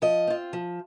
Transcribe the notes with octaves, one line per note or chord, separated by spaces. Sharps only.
F3 D#5
C4 F4
F3